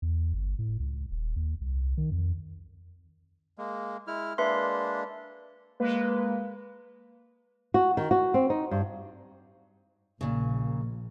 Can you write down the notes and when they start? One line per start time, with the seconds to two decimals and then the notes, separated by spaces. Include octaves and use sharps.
0.02 E2
0.33 G1
0.59 A2
0.80 C#2
1.11 D#1
1.36 D#2
1.61 C2
1.98 D#3
2.11 F2
3.58 G#3 A#3
4.07 G#3 E4 F6
4.38 G#3 A#3 D4 B4 E5 C6
5.80 G#3 A#3 B4
7.74 F#4
7.97 D#3
8.11 F#4
8.34 C4
8.50 D#4
8.71 G2
10.21 A#1 A#2 C#3